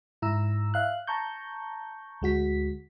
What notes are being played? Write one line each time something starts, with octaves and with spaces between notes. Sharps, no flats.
G#2 E4 A#5 E6
E5 F5 F#6
A5 A#5 C#6 G6
D2 G#3 F#4 B6